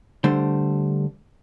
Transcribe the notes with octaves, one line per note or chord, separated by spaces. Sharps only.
D3 G3 A3 C5